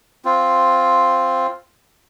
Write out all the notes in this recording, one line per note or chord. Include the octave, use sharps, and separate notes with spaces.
C4 F4